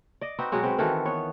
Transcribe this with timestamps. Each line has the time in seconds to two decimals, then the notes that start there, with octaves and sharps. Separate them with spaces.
0.21 D5 D#5
0.39 C4 D#4 F#4 B4
0.52 B2 F#3 G#3 F#4
0.63 C4 B4
0.78 D#3 E3 F#4 A4
1.05 B3 C#5